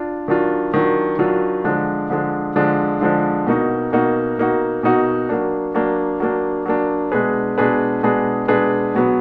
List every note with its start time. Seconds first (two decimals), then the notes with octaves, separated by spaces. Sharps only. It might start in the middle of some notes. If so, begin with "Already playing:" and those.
Already playing: D4 F4
0.28 D#3 F#3 D4 F4
0.74 D#3 F#3 D4 F4
1.19 D#3 F#3 D4 F4
1.64 D3 F3 G#3 D4
2.10 D3 F3 G#3 D4
2.56 D3 F3 G#3 D4
3.01 D3 F3 G#3 D4
3.46 B2 A#3 D#4 F#4
3.92 B2 A#3 D#4 F#4
4.38 B2 A#3 D#4 F#4
4.83 B2 A#3 D#4 F#4
5.29 F#3 A#3 D4
5.75 F#3 A#3 D4
6.20 F#3 A#3 D4
6.66 F#3 A#3 D4
7.12 B2 G#3 D4 G#4 B4
7.58 B2 G#3 D4 G#4 B4
8.03 B2 G#3 D4 G#4 B4
8.48 B2 G#3 D4 G#4 B4
8.95 B2 F#3 B3